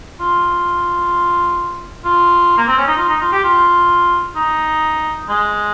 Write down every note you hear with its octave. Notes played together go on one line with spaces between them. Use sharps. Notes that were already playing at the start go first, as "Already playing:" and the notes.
F4
F4
A#3
C4
C#4
D#4
F4
D#4
F4
G4
F4
D#4
G#3